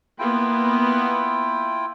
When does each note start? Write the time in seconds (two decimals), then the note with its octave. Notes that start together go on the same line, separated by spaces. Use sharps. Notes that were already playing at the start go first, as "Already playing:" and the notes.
0.19 A#3 B3 E4 F4 G5